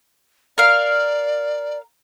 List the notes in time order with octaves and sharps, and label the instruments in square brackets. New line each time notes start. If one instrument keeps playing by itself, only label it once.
[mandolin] A#4 F5 [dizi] D5